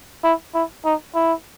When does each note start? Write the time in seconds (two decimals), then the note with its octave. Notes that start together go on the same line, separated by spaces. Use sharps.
0.24 E4
0.54 E4
0.85 D#4
1.15 E4